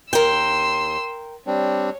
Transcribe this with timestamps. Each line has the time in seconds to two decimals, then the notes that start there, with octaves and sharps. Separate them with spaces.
0.13 D#2 A#4 G5 C6 E6
1.47 G3 C4 D4 C#5